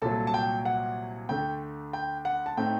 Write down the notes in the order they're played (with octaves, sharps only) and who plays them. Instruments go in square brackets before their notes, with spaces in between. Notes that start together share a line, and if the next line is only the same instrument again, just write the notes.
[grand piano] C2 A#2 F#3 A4 A5
A5
G5
F#5
D2 D3 A3 G5
G5
F#5
A5
A2 A3 C4 D#4 G5